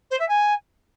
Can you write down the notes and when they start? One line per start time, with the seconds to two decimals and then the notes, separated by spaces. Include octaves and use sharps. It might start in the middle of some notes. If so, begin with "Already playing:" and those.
0.10 C5
0.19 E5
0.28 G#5